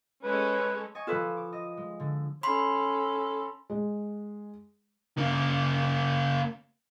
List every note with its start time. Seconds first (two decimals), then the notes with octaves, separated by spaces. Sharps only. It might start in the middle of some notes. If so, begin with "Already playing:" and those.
0.23 G#3 C#4 A4 B4
0.95 D#5 G#5 C#6
1.07 F3 F4 A4 B4 E7
1.37 D6
1.53 D#5
1.77 G#3
2.00 D3
2.43 C#4 A4 B5 C6
3.70 G#3
5.17 C#3 A#3